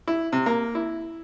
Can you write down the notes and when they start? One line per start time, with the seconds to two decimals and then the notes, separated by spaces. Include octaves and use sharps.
0.08 E4
0.32 C3
0.46 A#3
0.75 E4